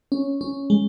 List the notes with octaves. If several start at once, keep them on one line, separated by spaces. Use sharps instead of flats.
C#4
C#4
G#3